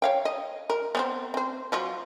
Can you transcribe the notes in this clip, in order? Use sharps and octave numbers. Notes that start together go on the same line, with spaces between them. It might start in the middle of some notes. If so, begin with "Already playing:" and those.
C#5 F5 G5
D#5
A#4
B3 C4 C5
C4 C5
F3 F#3 F4